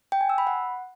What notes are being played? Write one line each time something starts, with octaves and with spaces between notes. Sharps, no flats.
G5
G#5
E6
B5
F#5